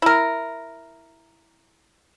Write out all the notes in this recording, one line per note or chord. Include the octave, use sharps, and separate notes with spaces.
E4 A#4